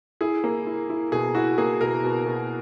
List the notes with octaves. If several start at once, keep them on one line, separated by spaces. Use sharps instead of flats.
E4 G#4
A#3
E4
E4
B2 G#4
E4 F#4
A#3 G#4
B2 A#4
B2
B2